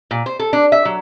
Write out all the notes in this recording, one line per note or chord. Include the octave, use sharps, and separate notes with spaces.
A#2
C5
A4
D4
E5
F#3